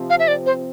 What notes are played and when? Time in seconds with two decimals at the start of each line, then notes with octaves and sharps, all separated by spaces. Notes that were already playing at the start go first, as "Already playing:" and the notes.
Already playing: C3 F3 C4
0.10 F5
0.19 E5
0.28 D5
0.46 C5